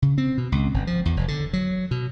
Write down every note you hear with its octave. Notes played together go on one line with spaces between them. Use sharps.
C#3
C4
B2
C#2
G1
F3
E2
F1
D3
F#3
B2